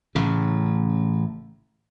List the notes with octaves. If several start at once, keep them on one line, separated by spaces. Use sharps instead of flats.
A1 A2 C#3